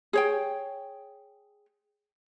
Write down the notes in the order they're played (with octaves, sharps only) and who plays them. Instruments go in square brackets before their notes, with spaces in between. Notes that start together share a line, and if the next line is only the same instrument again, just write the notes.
[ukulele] G#4 C#5 G5